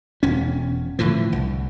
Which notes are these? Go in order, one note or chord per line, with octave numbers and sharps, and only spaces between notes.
E1 C#4
A2 D3 E3 F3
C2